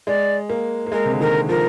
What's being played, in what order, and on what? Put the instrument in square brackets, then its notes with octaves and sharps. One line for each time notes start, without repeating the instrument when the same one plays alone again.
[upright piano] G#3 [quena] D5
[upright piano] A#3
A#3
[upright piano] G#3 [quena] A#4
[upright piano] C3
D3
[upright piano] D#3 [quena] A#4
[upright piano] F3 [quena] A#4